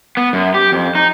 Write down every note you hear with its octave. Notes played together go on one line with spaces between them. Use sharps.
B3
F#2
G4
F2
D#4